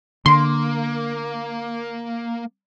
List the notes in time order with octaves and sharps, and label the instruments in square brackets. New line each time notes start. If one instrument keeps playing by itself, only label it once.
[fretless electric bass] D3 [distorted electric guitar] A#3 [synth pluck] C6